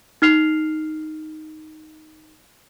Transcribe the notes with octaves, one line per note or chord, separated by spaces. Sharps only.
D#4 F6 C7 F7